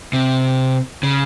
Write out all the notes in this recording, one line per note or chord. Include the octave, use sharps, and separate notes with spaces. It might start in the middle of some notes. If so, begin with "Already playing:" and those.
C3
C#3